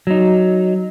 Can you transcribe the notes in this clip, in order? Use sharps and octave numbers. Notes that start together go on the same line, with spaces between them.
F#3 D#4